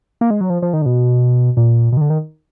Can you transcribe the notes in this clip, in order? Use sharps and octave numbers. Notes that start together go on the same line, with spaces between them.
A#3
G#3
F#3
F3
F3
D#3
D3
B2
A#2
B2
D#3
D3
D#3